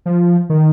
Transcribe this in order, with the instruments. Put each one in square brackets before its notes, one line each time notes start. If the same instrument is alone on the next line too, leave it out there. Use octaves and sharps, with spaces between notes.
[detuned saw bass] F3
D#3